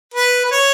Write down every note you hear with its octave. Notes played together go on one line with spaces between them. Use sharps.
B4
B4
C#5